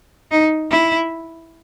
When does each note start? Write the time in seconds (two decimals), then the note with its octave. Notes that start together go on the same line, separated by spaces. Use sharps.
0.31 D#4
0.71 E4